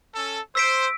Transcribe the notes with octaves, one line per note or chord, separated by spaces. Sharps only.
C#4 A4
C5 E6 B6 D7